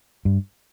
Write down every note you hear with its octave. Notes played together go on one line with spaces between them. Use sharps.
G2